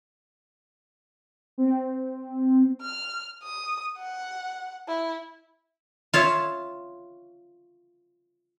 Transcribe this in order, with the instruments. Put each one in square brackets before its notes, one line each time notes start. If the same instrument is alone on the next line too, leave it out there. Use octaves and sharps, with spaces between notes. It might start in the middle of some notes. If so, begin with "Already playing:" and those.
[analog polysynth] C4
[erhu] F6
D#6
F#5
E4
[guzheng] F4 C#5 E5